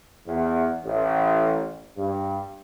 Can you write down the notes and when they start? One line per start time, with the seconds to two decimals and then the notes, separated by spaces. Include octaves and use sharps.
0.27 E2
0.85 A1
1.96 G2